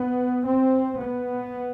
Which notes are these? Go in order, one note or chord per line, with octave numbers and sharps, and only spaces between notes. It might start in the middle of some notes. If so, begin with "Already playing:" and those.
Already playing: B3
C4
B3